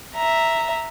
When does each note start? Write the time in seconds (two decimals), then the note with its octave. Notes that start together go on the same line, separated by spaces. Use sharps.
0.15 E5 A#5